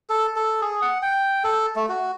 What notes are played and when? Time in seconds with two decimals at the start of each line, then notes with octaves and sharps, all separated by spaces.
0.10 A4
0.36 A4
0.62 G#4
0.82 F#5
1.02 G5
1.44 A4
1.76 A3
1.89 F#4